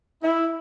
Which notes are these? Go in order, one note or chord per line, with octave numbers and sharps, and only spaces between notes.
E4